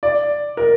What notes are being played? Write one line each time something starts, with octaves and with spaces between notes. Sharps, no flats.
D5
A#4